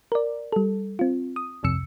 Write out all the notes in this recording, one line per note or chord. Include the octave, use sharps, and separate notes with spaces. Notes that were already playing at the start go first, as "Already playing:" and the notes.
A#4 D5
G3 A4
C4 F4
D#6
G1 C2 F2 C3 E6 C#7